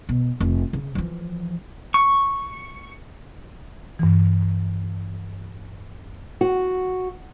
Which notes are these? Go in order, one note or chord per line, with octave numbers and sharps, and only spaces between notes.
B2
F1
C#3
E3 F3
C#6
G2 E3
F#4